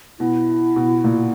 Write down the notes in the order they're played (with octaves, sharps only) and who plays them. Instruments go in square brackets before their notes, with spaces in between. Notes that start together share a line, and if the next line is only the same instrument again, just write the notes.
[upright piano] B2 [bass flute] E4
[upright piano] B2
A#2